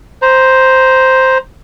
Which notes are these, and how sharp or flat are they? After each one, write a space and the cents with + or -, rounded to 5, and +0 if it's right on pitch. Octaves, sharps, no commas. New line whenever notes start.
C5 +0 A#5 +20